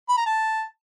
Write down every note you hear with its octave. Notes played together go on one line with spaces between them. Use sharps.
B5
A#5
A5